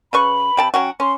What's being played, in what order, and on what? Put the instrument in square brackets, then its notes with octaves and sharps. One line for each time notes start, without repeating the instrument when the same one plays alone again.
[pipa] C#3 B4 C#6 [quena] B5
[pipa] C3 G5 A5
[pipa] F#3 C#4 F#4 [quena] G5
[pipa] C#4 [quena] C6